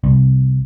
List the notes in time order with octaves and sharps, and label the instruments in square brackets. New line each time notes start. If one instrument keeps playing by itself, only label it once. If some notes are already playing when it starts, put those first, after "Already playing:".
[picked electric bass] C2